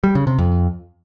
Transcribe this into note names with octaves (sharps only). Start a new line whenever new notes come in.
G3
C#3
C3
F2